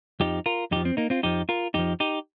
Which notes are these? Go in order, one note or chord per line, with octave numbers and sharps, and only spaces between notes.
F2 F3 D#4 G4
F4 A#4
F2 F3 D#4 G4
C4
A#3 D#4
C4 F4
F2 F3 D#4 G4
F4 A#4
F2 F3 D#4 G4
D#4 G4